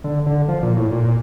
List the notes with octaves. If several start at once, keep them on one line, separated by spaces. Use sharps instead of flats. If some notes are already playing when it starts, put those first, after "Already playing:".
D3
D3
F3
A#2
A2
A#2
A#2